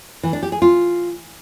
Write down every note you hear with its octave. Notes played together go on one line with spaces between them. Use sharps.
E3
D4
G4
G#4
F4